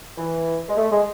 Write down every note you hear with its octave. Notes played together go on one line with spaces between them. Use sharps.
E3
G#3
A3
G#3